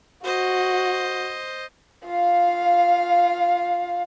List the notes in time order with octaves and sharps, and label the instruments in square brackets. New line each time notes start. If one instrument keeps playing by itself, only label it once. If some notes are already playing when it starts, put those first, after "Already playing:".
[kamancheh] F#4 [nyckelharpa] C5 D#5
[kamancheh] F4 F5